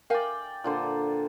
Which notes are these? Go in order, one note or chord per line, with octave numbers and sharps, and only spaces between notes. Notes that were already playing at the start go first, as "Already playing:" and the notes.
A#4 D5 F5 G5 G#5
A#2 D3 C5